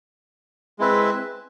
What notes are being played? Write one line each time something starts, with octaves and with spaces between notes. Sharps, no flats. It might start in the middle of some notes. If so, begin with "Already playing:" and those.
G#3 C4 E4 B4 E5